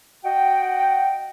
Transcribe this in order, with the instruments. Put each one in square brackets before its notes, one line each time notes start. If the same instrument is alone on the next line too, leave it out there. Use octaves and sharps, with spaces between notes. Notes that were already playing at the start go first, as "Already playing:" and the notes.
[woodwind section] F#4 D#5 F#5 G5